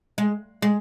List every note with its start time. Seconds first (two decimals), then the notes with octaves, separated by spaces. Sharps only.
0.18 G#3
0.62 G#3